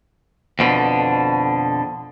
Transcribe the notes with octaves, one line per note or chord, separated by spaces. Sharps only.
F2 B2 D3